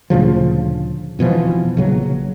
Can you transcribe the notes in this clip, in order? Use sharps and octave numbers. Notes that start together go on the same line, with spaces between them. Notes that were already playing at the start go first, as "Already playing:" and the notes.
D2 A#2 C#3 F3
F1 B2 E3 F3
A#1 C#3 F#3